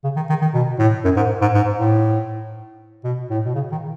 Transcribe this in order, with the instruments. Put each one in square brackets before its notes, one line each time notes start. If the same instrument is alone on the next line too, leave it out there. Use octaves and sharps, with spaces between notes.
[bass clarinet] C#3
D#3
D#3
D#3
B2
A2
F#2
G#2
G#2
G#2
A2
B2
A2
B2
C#3
D#3